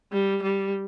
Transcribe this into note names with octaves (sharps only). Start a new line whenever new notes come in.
G3
G3